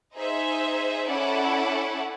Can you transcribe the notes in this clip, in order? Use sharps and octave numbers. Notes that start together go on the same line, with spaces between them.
D#4 G#4 C5 E5
C#4 E4 A4 D5 F#5